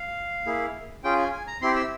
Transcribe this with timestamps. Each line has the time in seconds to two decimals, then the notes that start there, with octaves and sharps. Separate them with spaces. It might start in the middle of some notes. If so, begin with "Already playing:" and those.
Already playing: F5
0.46 A#3 E4 G#4
1.04 C#4 F4 G#4 G5
1.18 G#5
1.33 G#5
1.47 A#5
1.62 C4 E4 G4 C6
1.76 E6